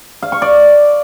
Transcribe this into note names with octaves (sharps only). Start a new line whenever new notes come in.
F5
C#6
D5